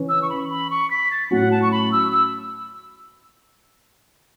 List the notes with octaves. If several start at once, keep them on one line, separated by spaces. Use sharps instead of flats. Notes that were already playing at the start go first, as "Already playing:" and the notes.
Already playing: C#3 E3 C#4
E6
C#6
B5
B5
C#6
B6
A6
A2 F#3 C#4 F#4 F#5
A5
C#6
B5
E6
E6